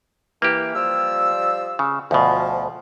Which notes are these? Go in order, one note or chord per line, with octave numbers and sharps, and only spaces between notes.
E3 A#3 G4
F3 G3 E6
C#3
D2 B2 F3